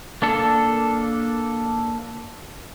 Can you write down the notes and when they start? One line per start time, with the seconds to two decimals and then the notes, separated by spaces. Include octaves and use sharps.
0.22 A#3 D4 A4